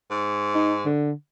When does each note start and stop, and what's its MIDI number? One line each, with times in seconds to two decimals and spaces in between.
0.11 0.86 44
0.55 0.74 63
0.86 1.12 50